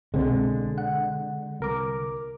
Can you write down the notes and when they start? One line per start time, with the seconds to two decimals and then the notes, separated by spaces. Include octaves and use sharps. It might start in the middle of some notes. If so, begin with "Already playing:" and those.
0.14 C2 B2 D3 G#3 C4
0.78 F#5
1.60 C2 A#4 D6